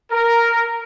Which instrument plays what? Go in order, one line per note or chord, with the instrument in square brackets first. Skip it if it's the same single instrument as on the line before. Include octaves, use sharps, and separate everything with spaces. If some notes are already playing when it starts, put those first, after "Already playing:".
[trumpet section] A#4